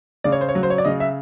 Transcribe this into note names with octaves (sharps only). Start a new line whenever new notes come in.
C#3 D5
C#5
C5
C#5
F#3
C5
C#5
D5
C#3 D#5
E5